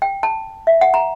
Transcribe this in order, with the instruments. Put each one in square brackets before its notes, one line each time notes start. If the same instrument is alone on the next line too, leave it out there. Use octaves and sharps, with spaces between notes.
[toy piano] G5
A5
E5
F#5
A#5